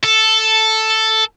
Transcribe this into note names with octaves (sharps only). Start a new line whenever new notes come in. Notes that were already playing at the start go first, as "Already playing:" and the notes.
A4